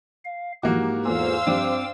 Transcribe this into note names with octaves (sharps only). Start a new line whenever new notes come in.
F5
G#2 E3 F3 A#3 F#4 G4
E2 B3 F4 A4 C5 F5 G#5 E6
G2 F3 C4 D4 G5 D6